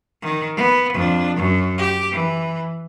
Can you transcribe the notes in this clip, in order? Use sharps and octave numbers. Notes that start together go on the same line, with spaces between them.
D#3
B3
F2 D4
F#2
G4
E3